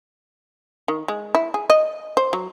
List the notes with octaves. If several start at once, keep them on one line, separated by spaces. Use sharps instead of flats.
D#3
G#3
E4
G#4
D#5
C5
F#3